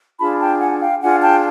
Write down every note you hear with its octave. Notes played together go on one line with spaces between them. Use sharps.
D4 F4 G#4 A5 B5
G5 A5
F#5 G#5
F5 G5
D4 F4 G#4 F#5 G#5
G5 A5